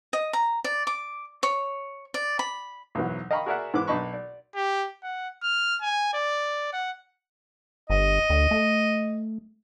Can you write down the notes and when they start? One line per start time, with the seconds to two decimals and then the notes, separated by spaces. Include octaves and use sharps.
0.13 D#5
0.33 A#5
0.64 D5
0.87 D6
1.43 C#5
2.14 D5
2.39 B5
2.95 B1 E2 G#2 E3 F#3
3.31 D#5 F5 G5 A#5 B5 C#6
3.46 F#4 G#4 A#4 D5 E5 F#5
3.74 G#2 E3 B4 D6
3.88 B1 D4 D#5 A5 B5 C#6
4.14 D5
4.56 G4
5.03 F#5
5.43 F6
5.82 G#5
6.14 D5
6.73 F#5
7.90 G1 D#5
8.30 D2
8.51 A3